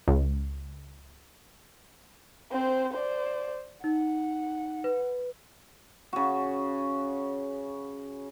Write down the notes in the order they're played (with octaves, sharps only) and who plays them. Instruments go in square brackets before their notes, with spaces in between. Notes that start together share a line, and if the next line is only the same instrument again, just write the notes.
[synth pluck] C#2
[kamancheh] C4 C5
C5 D5
[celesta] D#4 [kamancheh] F#5
[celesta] B4
[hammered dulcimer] C#3 F#4